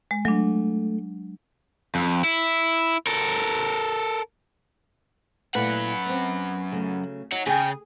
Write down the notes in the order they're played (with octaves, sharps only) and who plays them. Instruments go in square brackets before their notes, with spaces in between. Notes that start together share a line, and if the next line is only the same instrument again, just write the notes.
[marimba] G#3
[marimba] F#3 D4 [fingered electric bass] A3
[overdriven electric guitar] F2
E4
A4 A#4
[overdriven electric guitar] F#2 F#5 [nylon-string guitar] A#2 A3 E4 [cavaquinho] B4
[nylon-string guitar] B3 C4
C#3 F#3 A3
[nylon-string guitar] D#4 [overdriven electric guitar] C#5 F#5
[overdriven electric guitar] C#3 [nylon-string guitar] G#4 [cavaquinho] G5 G#5